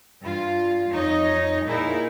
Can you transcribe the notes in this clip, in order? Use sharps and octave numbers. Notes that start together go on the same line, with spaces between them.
G2 F4
F2 D#4 C#5 D#5
A#2 D#4 E4 G#4 A#4